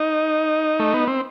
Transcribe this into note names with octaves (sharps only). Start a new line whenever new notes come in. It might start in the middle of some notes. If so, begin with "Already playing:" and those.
Already playing: D#4
A3
B3
C4